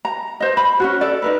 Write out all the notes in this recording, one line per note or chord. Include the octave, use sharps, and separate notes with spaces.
A#5
C5 D#5
B5
C#4 F4 F#4
A4 D5
D#4 A#4 B4